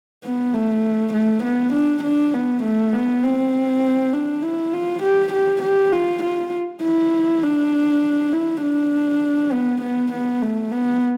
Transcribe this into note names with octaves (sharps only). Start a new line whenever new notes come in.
B3
A3
A3
B3
D4
D4
B3
A3
B3
C4
D4
E4
F4
G4
G4
G4
F4
F4
E4
D4
E4
D4
B3
B3
B3
A3
B3